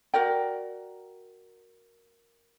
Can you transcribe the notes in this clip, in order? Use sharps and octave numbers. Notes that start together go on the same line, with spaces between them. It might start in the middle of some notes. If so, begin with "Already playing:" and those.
F#4 A#4 D5 G5